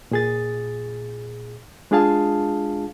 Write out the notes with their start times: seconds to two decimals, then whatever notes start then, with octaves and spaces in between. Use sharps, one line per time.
0.11 A#2 G#4 A6
1.91 G#3 D4 F4 G#4 F5 A5